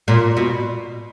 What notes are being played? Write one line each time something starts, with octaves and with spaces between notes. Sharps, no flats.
A#2
B2